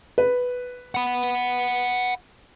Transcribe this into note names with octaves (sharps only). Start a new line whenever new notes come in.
B4
F#5 B5